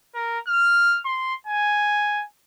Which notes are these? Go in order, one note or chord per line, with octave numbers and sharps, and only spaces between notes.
A#4
F6
C6
G#5